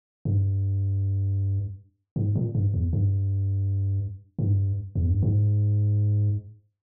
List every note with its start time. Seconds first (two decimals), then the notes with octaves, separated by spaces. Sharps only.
0.25 G2
2.16 G#2
2.35 A#2
2.55 G2
2.74 E2
2.93 G2
4.39 G#2
4.46 G2
4.95 E2
5.09 G2
5.23 G#2